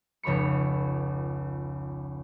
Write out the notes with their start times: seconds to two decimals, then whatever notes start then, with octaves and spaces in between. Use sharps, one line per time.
0.23 F1 C#2 C#5 B5 C#7